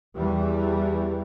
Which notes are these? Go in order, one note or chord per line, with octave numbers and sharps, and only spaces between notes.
E2 E3 G3